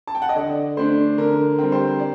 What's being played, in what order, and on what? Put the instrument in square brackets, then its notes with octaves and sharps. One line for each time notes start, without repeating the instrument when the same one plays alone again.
[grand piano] A5
G5
F#5
D#5
D3 D5
A3 D4 C5
D3 A#4
G3 C4
C5
D5